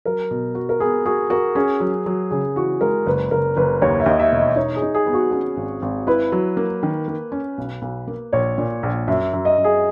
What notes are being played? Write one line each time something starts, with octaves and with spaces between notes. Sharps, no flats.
F#3 A#4
B2
F#4
A#4
B3 G#4
F#4 G#4
F#4 A#4
C#4 G#4
F#3
F#3
C#3 G#4
E3 F#4
G#3 A#4
F#1 B4
F#1 A#4
F#1 B4
D#2 C#5
E5
D#2 D#5
E5
E1
D#5
D#4 C#5
G#4
D#4
G#4
B3
F#4
C#4 G#4
G#1
G#1
E4 B4
F#3
A#3
D#3
A#3
C#4
B1
B1
A#3
A#1 C#5
A#2
A#1
F#2 E5
F#2
D#5
F#2
G#4